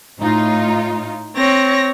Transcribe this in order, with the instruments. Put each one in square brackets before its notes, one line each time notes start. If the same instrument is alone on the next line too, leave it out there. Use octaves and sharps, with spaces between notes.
[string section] A2 D#4 F4
[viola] C4 C#5 [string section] A#6